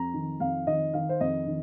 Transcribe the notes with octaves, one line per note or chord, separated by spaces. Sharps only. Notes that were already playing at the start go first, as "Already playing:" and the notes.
Already playing: F2 A#5
D#3
F2 F5
D#3 D#5
D#3 F5
C5
F2 D#5
D#3